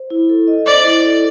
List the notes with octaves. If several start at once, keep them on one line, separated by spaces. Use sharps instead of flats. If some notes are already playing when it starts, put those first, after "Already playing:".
Already playing: C5
E4
A4
D#5
C5 D5
E4
A4